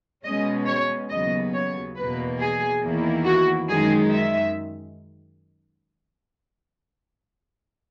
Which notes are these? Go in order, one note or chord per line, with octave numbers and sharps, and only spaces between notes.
B2 G#3 C#4 D#5
C#5
D#2 C#3 F#3 B3 D#5
C#5
E2 B2 A#3 B4
G#4
E2 D#3 A#3 E4
F#4
F#2 D#3 G#3 D#4 G#4
E5